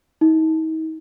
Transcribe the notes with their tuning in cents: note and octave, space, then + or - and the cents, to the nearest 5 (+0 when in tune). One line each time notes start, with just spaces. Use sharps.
D#4 +40